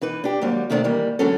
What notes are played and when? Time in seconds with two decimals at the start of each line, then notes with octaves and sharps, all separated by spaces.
0.01 E3 D#4 B4
0.24 D4 G4
0.41 D#2 G#2 F#3 G3
0.70 C3 D#3 G3 A3 D4
0.84 D#3 E3 G3 A#3
1.19 D3 E3 F#3 G#3 C#4 A4